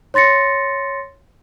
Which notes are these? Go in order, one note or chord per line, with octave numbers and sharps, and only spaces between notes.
C#5 C6 A6 A#6 C#7